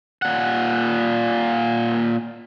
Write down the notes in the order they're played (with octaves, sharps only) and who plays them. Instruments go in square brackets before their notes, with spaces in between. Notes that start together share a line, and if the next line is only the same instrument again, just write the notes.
[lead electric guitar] A#2 F#5